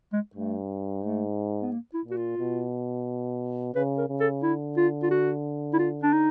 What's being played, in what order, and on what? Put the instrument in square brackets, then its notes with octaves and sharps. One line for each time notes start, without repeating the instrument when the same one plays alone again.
[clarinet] G#3
[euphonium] G2 [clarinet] A3
[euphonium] G#2 [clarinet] A3
[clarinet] B3
A#3
E4
[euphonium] A#2
[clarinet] F#4
F4
[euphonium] B2
[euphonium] C#3 [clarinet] B4
[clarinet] A#4
[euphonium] C#3
[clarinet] A4
[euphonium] D3 [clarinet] E4
[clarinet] F4
F4
F#4
E4
F4
D4
D#4